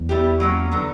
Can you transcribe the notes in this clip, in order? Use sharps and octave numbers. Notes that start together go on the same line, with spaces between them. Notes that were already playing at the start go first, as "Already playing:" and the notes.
Already playing: E2
G3 B3 E4 G4
F#3 A#3 C#4
D3 F#3 B3